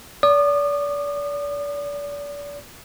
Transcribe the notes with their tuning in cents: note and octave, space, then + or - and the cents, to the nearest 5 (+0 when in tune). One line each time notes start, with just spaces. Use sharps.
D5 -35 D#6 -40